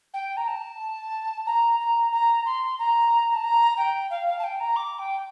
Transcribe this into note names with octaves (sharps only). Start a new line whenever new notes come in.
G5
A#5
A5
A#5
A#5
A#5
C6
A#5
A5
A#5
G5
F5
F5
A5
G5
A#5
D6
G5